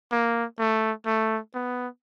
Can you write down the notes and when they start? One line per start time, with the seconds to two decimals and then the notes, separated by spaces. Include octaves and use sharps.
0.11 A#3
0.59 A3
1.06 A3
1.54 B3